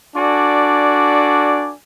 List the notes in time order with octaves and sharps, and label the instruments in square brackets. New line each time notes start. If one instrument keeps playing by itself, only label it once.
[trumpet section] D4 F#4 A4 D5 G#5